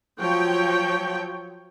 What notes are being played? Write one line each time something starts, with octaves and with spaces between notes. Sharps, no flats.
F3 F#3 C#5 G5